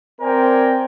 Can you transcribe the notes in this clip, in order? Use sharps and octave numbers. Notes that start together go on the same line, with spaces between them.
C4 A#4 C5 D5 G5 G#5